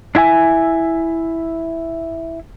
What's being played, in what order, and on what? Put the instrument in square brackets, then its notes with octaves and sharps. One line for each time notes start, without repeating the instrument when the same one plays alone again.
[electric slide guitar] D4 E4 E5 G#5